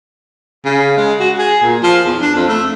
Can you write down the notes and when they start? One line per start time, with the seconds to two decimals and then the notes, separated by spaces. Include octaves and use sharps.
0.65 C#3
0.97 G#3
1.20 F#4
1.38 G#4
1.62 A#2
1.82 F3
2.05 E2
2.21 D4
2.35 F2
2.48 A3